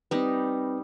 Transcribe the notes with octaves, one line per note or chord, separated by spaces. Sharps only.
G3 C4 D#4 B4